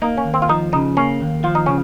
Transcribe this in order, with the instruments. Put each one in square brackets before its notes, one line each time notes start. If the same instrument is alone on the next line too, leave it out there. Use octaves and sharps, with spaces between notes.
[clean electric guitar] A#3 [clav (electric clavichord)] D#4
[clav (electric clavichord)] C#4
[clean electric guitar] D#2
[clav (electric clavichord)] C4
F4
[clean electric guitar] F3 [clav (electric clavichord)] D#4
[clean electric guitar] C#3 [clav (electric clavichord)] D#4
[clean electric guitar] A#3 [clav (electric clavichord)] C#4
[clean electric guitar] D#2
[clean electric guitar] F3 [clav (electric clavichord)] F4
[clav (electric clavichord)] D#4
[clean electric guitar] C#3 [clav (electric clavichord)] C#4